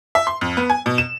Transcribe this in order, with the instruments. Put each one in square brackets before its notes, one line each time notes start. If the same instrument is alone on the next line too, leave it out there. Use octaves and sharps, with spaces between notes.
[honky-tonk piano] E5
C6
F2
B3
G#5
B2
E7